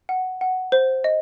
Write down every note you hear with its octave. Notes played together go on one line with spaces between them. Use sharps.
F#5
F#5
C5
D#5